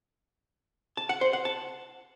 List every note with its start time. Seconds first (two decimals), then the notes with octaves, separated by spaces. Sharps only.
0.97 A5
1.09 F#5
1.21 C5
1.33 F#5
1.45 A5